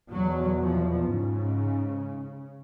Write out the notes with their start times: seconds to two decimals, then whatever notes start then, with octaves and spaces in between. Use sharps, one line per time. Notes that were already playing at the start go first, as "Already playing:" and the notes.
0.12 E2 B2 F#3
0.61 F3
1.09 G#2 C#3